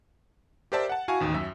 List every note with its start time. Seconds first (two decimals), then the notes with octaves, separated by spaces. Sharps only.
0.72 G4 A#4 C5 D5 E5 A5
0.89 F#5 A5
1.08 E4 F#4 F5 G#5 A5 C#6
1.20 A1 D#2 D#3
1.34 F#2 E5